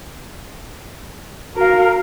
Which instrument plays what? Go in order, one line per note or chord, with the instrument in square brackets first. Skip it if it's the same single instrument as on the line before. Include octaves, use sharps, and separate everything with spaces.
[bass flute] F#4 [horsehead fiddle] A#4 F5